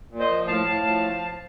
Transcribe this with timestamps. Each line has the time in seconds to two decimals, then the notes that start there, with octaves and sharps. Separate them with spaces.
0.10 A#2
0.20 C5 D#5
0.29 F3
0.47 A2 F5 A5
0.66 A2
0.85 F3